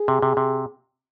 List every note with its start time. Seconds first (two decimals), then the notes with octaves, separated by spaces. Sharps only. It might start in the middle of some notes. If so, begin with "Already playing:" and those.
Already playing: G#4
0.08 C3
0.22 C3
0.37 C3